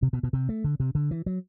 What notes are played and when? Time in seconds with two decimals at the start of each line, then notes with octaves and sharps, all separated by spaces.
0.02 C3
0.13 B2
0.23 B2
0.33 C3
0.49 A3
0.64 D3
0.80 C3
0.95 D3
1.11 E3
1.26 F#3